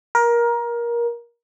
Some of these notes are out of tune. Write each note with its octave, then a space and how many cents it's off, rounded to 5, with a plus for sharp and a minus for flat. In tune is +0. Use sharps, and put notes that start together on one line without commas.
A#4 +20